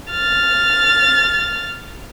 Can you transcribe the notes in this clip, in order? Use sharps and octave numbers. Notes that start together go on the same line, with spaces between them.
F6 A6